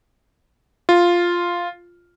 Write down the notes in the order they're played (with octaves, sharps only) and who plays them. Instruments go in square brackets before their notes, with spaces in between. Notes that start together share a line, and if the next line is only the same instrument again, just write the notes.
[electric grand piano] F4